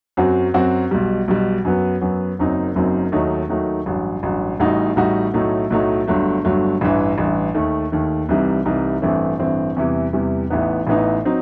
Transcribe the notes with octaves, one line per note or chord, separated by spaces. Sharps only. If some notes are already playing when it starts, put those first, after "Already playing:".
F#2 F#3 C4 F#4
F#2 F#3 C4 F#4
B1 B2 G3
B1 B2 G3
F#2 F#3 B3
F#2 F#3 B3
F#1 F#2 F#3 C4 D#4
F#1 F#2 F#3 C4 D#4
D#2 D#3 F#3 A3 D#4
D#2 D#3 F#3 A3 D#4
A1 G2 F#3
A1 G2 F#3
A1 A2 G3 D#4 F#4
A1 A2 G3 D#4 F#4
B1 A2 F#3 A3 D#4
B1 A2 F#3 A3 D#4
G1 G2 F#3 A3
G1 G2 F#3 A3
A1 G2 E3
A1 G2 E3
D#2 D#3 A3
D#2 D#3 A3
C2 C3 E3 G3 D#4
C2 C3 E3 G3 D#4
A1 G2 E3 A3 C4
A1 G2 E3 A3 C4
E2 C3 E3 G3
E2 C3 E3 G3
A1 A2 E3 B3 D#4
A1 A2 E3 B3 D#4
F#3 C4 D#4